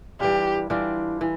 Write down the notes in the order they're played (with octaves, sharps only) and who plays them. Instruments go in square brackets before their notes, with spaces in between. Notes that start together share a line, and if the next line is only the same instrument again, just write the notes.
[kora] E3 G3 D4 F4 [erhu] G4
[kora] E3 G3 D4 F4
E3